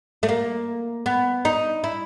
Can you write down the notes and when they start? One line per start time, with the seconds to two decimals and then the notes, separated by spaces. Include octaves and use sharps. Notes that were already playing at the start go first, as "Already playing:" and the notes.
0.23 A3
0.29 A#3
1.06 B3
1.45 D#4
1.84 E4